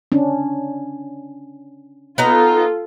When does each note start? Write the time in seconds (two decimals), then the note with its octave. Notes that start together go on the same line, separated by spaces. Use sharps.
0.12 C#4 D4
2.18 B3 D#4 F4 A4 A#5